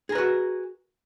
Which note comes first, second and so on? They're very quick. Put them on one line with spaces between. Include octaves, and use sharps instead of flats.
G#4 A#4 B4 F#4